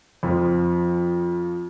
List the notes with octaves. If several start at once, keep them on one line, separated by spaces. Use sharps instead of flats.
F2 F3